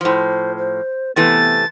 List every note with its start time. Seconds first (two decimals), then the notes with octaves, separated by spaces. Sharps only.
0.01 A2 F3 C5
0.58 C5
1.16 C3 E3 A3 B3 A6